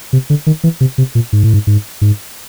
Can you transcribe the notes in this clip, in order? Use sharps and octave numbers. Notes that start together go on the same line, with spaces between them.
C3
D3
D#3
E3
C3
C3
A#2
G#2
A2
G#2
G#2
G#2